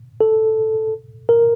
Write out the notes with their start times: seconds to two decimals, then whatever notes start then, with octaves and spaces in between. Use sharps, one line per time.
0.21 A4
1.29 A#4